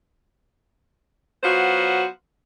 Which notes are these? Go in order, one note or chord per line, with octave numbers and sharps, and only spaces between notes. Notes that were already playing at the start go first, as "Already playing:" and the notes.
F#3 B3 F4 F#4 C5